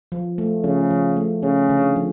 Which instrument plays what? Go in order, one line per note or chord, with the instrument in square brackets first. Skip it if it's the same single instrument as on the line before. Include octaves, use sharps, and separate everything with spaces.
[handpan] F3
A3
[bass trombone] C#3 [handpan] F3
[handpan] F3
A3
[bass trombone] C#3 [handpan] C#4
[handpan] D3
F3